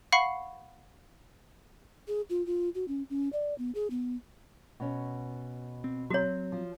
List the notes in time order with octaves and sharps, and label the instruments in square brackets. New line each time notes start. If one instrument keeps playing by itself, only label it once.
[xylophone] F5 F#5 B5 C#6 C7 C#7
[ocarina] G#4
F4
F4
F#4
C#4
C#4
D5
B3
G#4
B3
[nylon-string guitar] B2 C#4
[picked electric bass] C4
[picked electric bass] F#3 C4 [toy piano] F#4 C#5
[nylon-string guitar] F3